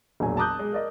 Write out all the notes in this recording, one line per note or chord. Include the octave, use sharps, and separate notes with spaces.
E1 A#1 F#3 G#5
A5 A#5 D6 D#6 F#6 G6
G#3
A#4 D5 D#5